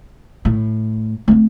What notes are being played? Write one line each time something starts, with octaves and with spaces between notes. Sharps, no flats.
A2
A3 C4